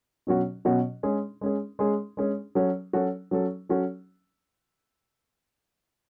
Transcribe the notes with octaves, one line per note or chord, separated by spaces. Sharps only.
B2 F#3 C#4 F#4
B2 F#3 C#4 F#4
G#3 C#4 G#4
G#3 C#4 G#4
G#3 C#4 G#4
G#3 C#4 G#4
F#3 C#4 F#4 A4
F#3 C#4 F#4 A4
F#3 C#4 F#4 A4
F#3 C#4 F#4 A4